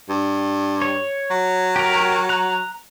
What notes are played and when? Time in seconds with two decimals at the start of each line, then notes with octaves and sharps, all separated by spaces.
0.09 G2
0.82 C#5
1.31 F#3
1.76 G4 A#4
2.29 A#5 F#6